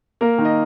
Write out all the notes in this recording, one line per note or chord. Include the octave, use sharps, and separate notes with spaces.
A#3 A#4
D#3
D#5